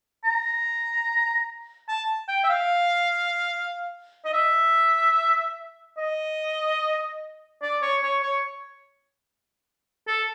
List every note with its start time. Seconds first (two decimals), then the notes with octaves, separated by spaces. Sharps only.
0.24 A#5
1.88 A5
2.28 G5
2.44 E5
2.49 F5
4.25 D#5
4.33 E5
5.97 D#5
7.62 D5
7.82 C#5
8.02 C#5
8.23 C#5
10.07 A4